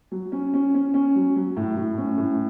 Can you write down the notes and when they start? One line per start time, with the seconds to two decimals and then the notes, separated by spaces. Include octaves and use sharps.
0.12 F#3
0.32 C#4
0.54 C#4
0.74 C#4
0.94 C#4
1.16 F#3
1.36 F#3
1.57 A2
1.77 A2
1.98 C#4
2.18 A2